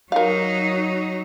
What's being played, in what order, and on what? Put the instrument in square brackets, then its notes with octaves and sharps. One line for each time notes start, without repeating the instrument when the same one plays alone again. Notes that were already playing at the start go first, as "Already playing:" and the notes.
[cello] F#3 D#4 [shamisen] A#4 F5